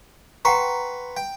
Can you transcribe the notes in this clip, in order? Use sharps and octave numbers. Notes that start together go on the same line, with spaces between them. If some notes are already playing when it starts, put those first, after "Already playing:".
B4 F#5 G5 A#5 C6 C#6
G5